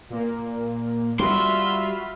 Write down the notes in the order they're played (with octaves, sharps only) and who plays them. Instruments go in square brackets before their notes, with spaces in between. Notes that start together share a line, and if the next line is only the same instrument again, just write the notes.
[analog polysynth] A#2 A#3
[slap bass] G3 [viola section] F4 E5 [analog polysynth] F#4 B5 F6 [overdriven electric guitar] C6